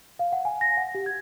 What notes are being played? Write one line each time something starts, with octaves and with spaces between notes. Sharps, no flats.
F5
F#5
G#5
A#6
F#5
G4
G#6